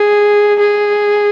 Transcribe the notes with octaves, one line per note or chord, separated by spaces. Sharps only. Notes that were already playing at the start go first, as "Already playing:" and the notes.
Already playing: G#4
G#4